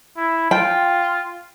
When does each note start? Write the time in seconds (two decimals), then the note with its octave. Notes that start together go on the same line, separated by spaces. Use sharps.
0.17 E4
0.51 F4 G5